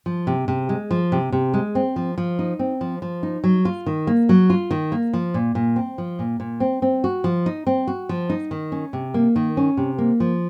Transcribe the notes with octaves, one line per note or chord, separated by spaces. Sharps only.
F3
C3
C3
G#3
F3
C3
C3
G#3
C4
F3
F3
D#4
C4
F3
F3
D#4
F#3
F4
D#3
A#3
F#3
F4
D#3
A#3
F3
A#2
A#2
C4
F3
A#2
A#2
C4
C4
F#4
F3
D#4
C4
F#4
F3
D#4
D#3
C#4
C3
A#3
D#3
C#4
C3
A#3
F3